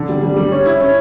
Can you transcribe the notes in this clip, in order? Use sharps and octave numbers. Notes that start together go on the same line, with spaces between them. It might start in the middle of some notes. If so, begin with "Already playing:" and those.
Already playing: D3
G3
G3
G3
C#4
E4
C#4